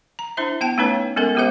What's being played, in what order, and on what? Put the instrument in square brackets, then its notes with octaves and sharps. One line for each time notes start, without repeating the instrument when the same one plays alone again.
[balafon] A#5
D4 E4 C5 E5
B3 G5 A5
A3 B3 C#4 D#4 B4 C#5
G#3 B3 C#4 A4 A#4
G#3 B3 G4 G#4 C5 F5